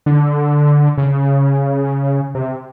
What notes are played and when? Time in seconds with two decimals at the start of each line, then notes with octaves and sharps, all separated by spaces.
0.06 D3
0.98 C#3
2.35 C3